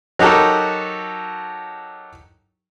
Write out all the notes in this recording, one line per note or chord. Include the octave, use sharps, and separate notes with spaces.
F#3 D#4 F#4 G4 A4 A#4